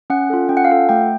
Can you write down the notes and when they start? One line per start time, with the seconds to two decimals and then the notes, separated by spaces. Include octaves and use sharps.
0.10 C#4 F#5
0.30 F4 A4
0.49 C#4 G5
0.57 F#5
0.65 F5
0.70 F4 A4 F#5
0.89 A3 G5